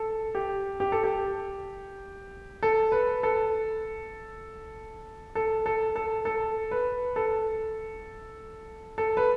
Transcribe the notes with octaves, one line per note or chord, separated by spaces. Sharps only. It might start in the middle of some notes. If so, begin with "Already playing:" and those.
Already playing: A4
G4
G4
A4
G4
A4
B4
A4
A4
A4
A4
A4
B4
A4
A4
B4